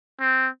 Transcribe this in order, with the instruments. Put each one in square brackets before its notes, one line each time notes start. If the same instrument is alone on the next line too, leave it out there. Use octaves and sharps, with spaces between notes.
[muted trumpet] C4